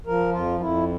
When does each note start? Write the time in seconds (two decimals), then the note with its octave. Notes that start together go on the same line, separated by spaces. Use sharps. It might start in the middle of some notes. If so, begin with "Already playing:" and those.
0.06 F3 A#4
0.32 F2 F4
0.60 F2 E4